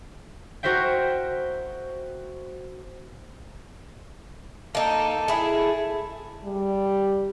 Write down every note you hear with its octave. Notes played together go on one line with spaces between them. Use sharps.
F#4 A#4 C5 E5 G5
A#3 D#4 A4
E4 G#4
G3